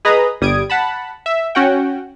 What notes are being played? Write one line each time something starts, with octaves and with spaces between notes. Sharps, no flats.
G#4 B4 D#5 A#5 B5 D#6
G1 G3 D#6 G#6 D7
F#5 A5 B5
E5
C#4 F#4 F#5 G5